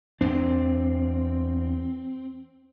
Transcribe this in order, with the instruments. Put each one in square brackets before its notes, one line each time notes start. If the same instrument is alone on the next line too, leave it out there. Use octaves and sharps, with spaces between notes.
[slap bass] E2 D4 [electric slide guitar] C4